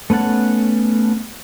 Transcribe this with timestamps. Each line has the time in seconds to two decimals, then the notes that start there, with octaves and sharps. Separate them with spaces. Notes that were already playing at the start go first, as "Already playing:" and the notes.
0.10 A3 B3 C#4 F#5 A5